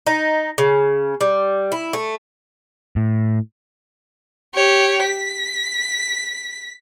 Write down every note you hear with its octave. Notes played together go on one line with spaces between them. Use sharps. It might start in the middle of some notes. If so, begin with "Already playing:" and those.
D#4
C#3
G3
E4
A3
A2
G4 C#5
B6